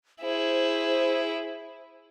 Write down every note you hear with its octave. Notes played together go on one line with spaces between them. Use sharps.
E4 G#4 C5